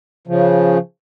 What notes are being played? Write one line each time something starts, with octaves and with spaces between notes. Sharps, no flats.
C#3 F3